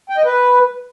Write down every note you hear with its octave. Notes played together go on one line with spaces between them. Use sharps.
G5
D#5
B4